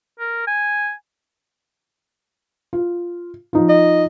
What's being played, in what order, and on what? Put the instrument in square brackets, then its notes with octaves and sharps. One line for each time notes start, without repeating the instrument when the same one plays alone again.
[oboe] A#4
G#5
[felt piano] F4
F3 D#4 F4
[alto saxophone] D#5